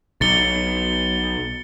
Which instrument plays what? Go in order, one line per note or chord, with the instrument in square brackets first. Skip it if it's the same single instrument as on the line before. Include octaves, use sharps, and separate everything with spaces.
[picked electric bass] B1 [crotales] A6 C#7 G7